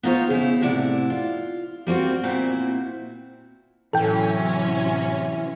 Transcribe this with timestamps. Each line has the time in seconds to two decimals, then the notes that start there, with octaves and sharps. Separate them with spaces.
0.03 B3 D#4 F4 C5 C#5
0.30 C#3 E4
0.61 A2 C3 E4 D5 F#5
1.10 F4
1.87 G3 A#3 C4 F#4
2.24 A#2 C4 E4 F#4
3.93 A2 C3 E3 F#3 C#4 A4 G5